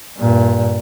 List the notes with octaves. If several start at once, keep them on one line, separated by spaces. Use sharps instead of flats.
G2 A#2